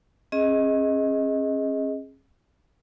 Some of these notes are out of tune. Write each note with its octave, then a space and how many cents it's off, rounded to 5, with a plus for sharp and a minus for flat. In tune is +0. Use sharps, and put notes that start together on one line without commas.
C#4 -40 G#4 +0 D#5 +15